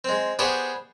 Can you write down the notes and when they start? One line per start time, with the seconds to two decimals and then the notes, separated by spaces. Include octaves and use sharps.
0.04 G#3 C4
0.39 B3 D4 G4 G#4 C5 C#5